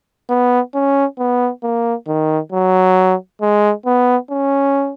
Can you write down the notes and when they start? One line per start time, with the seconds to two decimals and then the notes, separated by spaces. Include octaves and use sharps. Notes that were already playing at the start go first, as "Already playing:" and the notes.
0.29 B3
0.74 C#4
1.19 B3
1.63 A#3
2.08 D#3
2.52 F#3
3.41 G#3
3.86 B3
4.30 C#4